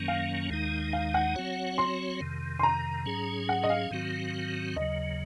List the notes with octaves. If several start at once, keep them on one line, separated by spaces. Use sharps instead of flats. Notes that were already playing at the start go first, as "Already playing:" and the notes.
Already playing: F#2 D#3 F#3 A#3 C#4
F5
D#2 D#3 G#3 D#4
F5
F#5
F#3 C4 F#4 C#5
C6
F2 C3 D#3
C6
A#5
G#2 F#3 C#4 G#4
F#5
D#5
F5
G#2 D#3 F#3 C4 F#4
D#2 C#3 F#3 D#5